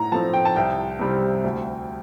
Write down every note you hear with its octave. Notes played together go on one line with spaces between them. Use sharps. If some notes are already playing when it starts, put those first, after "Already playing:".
Already playing: A2 A#5
F3 A3 C4 A5
G5
A5
C2 G5
C3 G3 C4
D2